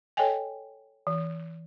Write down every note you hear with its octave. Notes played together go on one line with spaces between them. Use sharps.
A4 C#5 D#5 G5 G#5
E3